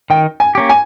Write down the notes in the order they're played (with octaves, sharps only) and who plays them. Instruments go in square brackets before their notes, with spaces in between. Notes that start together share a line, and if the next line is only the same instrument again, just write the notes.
[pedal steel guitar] D#3 [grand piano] G5
[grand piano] G#5
[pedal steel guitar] A#3 C#4 G4
[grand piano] G#5